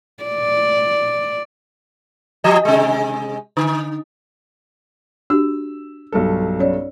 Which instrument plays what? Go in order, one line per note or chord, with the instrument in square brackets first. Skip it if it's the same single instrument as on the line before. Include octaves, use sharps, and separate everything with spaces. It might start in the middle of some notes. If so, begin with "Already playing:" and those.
[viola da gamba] D5
[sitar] F3 G4 D#5
C3 G#3
D3
[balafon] D4 F#4 G4 [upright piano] E6
[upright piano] B1 G2 A4
[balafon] C#4 C#5 D5